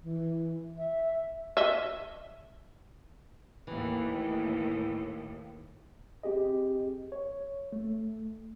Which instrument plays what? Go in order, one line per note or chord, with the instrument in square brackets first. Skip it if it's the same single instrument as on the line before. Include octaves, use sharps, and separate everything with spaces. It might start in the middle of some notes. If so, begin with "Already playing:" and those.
[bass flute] E3
E5
[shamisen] D#5 E5
[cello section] D#2 A2 [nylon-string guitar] E3
[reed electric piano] C4 G4 G#4 D#5
C#5
A3